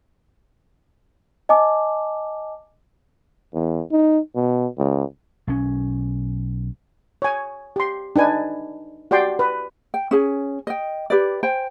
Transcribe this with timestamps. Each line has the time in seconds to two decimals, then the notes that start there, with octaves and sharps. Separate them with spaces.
1.49 D#5 G#5 A5 D6
3.54 E2
3.92 D#4
4.36 B2
4.78 C#2
5.47 B1 C#4
7.22 C#5 G#5
7.76 G4 C6
8.16 D4 D#4 B4 G#5
9.11 F#4 G4 D5 G5 C6
9.39 B4
9.94 G5
10.11 C#4 G#4 G#5
10.67 D#5 G5
11.10 G4 B4 D5
11.43 C5 G5 G#5